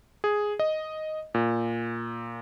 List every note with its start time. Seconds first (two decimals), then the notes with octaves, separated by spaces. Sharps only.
0.24 G#4
0.59 D#5
1.34 A#2